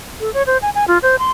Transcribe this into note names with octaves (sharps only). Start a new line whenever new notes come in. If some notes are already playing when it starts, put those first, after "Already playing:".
A4
C#5
C5
G#5
G#5
F4
C5
C6